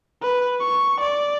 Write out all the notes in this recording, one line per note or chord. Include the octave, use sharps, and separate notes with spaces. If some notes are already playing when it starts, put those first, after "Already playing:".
B4
C#6
D5